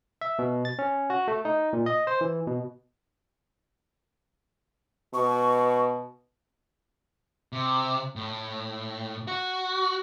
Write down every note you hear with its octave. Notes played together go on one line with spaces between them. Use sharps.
E5
B2
A6
C#4
F#4
A3
D#4
A#2
D#5
C5
E3
B2
B2 C#6
C3
A2
F#4